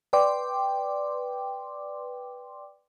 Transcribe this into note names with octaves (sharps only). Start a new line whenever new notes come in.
B4 D5 G5 C6 D6